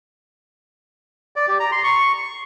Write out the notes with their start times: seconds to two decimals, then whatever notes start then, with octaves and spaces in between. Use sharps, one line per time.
1.36 D5
1.48 G4
1.60 A#5
1.72 C6
1.84 C#6